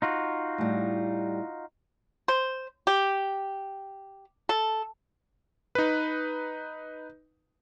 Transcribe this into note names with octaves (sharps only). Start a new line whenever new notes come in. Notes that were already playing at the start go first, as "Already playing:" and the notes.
D#4 F4 F#4
A2 G3
C5
G4
A4
D#4 B4